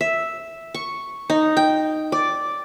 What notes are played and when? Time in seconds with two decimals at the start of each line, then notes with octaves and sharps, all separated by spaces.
0.01 E5
0.74 C#6
1.30 D#4
1.57 G5
2.12 D5